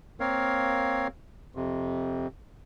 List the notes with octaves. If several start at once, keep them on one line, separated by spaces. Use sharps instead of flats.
A#3 C4 A#4 C#5 F5
F2 C3